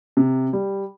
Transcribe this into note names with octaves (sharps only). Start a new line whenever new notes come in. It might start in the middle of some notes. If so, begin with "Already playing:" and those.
C3
G3